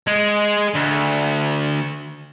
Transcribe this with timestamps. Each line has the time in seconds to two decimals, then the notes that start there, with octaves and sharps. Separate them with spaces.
0.07 G#3
0.75 D2